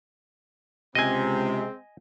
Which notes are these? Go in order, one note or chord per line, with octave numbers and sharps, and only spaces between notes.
C#2 C3 G#3 C4 D#5 G#5